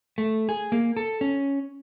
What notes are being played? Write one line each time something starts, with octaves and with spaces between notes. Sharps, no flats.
A3
G#4
A#3
A4
C#4